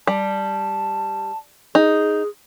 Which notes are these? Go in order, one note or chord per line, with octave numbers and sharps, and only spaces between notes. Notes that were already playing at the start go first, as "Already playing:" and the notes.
G3 A5
D#4 G#4